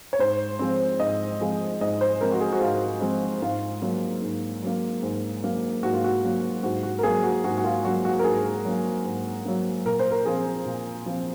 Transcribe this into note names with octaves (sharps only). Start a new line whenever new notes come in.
C#5
G#2 C5
F3 G#3 C4
G#2 D#5
F3 G#3 C4
G#2 D#5
C5
F3 G#3 C4 A#4
F#4
G#4
F#4
G#2 F4
F3 G#3 C4
G#2 F4
F#3 A#3
G#2
F#3 A#3
G#2
F#3 A#3
G#2 F#4
F4
F#4
F#3 A#3
G#2 F#4
F#4
A#4
F#3 A#3 G#4
F#4
G#2 F#4
F#4
F4
F#3 A#3 F#4
F#4
A#4
G#2 G#4
F#3 A#3
G#2
F#3 A#3
A#2 A#4
C5
A#4
F3 C4 G#4
A#2
F3 C4